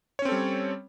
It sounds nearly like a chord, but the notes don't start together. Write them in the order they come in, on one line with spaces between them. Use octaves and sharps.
C#5 C#4 C4 A4 G3